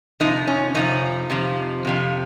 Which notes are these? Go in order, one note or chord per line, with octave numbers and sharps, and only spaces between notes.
F2 C3 F3 D#4
C#4
F2 C3 F3 D#4
F2 C3 F3
F2 C3 F3